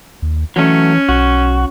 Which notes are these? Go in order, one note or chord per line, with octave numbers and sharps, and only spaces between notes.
D#2
E3 F#3 A3 C#4
B1 F#4